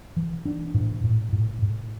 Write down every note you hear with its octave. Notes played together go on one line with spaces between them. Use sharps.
E3
D4
A2
A2
A2
A2